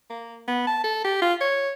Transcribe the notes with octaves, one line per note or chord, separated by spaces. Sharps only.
A#3
B3
A5
A4
G4
F4
C#5